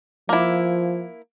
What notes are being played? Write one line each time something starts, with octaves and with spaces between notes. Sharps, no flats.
F3 A#3 E4